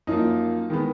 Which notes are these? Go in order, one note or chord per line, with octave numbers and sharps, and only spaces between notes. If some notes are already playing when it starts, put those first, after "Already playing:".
F#2 F3 A#3 D#4
D#3 G#3 B3